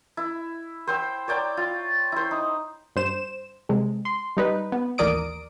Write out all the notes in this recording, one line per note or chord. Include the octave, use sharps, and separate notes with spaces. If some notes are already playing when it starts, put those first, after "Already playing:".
E4
C5 G5 E6
C#5 D5 G5 A#5
F4
E4 C5
D#4
G2 C5 E7
C3 G#3
C6
G3 D#4 B4
B3
A1 D#2 A#4 D5 D#6 D7